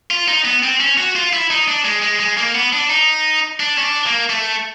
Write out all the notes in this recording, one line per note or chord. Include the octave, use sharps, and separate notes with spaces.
F4
D#4
B3
C4
C#4
F#4
F4
E4
D#4
D4
G#3
G#3
G#3
A#3
B3
D4
D#4
D4
C#4
D4
A#3
A3